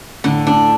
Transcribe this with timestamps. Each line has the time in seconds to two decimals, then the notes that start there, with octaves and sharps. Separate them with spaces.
0.24 A2 D3
0.47 A2 D4